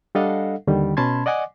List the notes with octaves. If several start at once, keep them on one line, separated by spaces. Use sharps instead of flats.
G3 D4 A4 D#5 F5 F#5
D#2 D3 D#3 G3
B2 C#4 A5 B5 C6 G#6
D5 D#5 F#5 G#5 D6